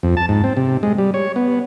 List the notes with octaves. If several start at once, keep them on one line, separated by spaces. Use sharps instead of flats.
F2
A5
G#2
C4
C3
G#3
G3
C#5
B3